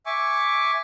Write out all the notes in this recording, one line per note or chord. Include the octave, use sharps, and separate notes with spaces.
E5 G#5 C#6 D6